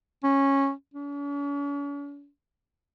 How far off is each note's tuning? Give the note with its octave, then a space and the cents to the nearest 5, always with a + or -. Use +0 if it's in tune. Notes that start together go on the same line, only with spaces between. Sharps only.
C#4 -10
C#4 +45